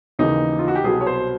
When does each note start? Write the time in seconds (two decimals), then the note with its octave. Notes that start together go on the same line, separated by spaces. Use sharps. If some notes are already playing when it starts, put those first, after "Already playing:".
0.19 D#2 C#3 E3 D#4
0.59 F4
0.68 F#4
0.75 G4
0.84 C2 B2 F#3 G#4
1.01 C#5
1.07 C5